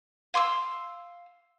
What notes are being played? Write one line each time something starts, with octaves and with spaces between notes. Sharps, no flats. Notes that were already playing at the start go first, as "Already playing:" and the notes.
F5 C6 D6 E6